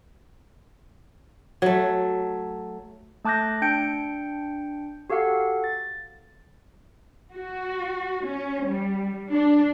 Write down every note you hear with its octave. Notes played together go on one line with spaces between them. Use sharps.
F#3 A3
A3 A5 D6 F#6 G6 A#6
D4 G5 G6 C#7 D7
F#4 G4 A4 F5 F#5
A6
F#4
C#4
G3
D4